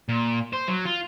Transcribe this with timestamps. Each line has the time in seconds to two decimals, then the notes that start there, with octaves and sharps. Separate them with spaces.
0.09 A#2
0.53 C5
0.68 F#3
0.85 F4